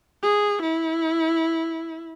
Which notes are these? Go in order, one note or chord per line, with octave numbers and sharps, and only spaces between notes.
G#4
E4